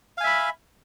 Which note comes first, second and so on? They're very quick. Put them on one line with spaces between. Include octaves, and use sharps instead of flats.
F5 G#5 E5 B5